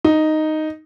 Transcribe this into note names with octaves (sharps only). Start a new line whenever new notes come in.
D#4